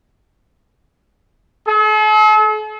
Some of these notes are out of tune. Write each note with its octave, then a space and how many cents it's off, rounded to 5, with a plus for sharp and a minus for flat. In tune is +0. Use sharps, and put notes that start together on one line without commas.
A4 -45